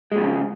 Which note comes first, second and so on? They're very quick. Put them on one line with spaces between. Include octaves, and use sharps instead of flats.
G#3 A#2 F2 C#3